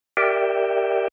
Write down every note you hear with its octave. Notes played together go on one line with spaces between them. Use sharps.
G4 A#4 D5 E5 G5